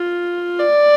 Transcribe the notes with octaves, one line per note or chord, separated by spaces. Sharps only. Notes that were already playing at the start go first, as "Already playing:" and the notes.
Already playing: F4
D5